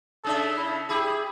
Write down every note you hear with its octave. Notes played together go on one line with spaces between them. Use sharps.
C#3 C#4 A4 E5
E4
E4 G4 G#4